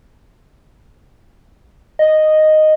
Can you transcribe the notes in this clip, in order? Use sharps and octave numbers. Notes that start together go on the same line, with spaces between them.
D#5